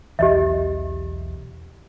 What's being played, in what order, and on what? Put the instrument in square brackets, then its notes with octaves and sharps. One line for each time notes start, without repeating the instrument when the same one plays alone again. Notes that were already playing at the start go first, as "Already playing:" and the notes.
[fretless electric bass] B1 E2 E3 [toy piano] G4 D#5 E5